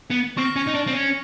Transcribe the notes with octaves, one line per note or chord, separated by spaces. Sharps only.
B3
C4 C#6 F6 A#6
C#4
D#4
D4
C4
C#4